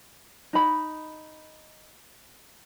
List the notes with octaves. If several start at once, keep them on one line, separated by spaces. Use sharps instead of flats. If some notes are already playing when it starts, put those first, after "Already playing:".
D#4 B5